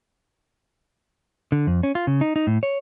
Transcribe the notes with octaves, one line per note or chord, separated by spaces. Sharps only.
D3
F2
C#4
F4
C#3
D#4
D#4
A2
C#5